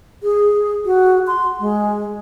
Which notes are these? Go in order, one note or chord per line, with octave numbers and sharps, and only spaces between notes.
G#4
F#4
C6
G#3